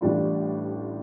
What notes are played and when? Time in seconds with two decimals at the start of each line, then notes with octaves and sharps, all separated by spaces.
0.01 A1 A2 G3 D4 F4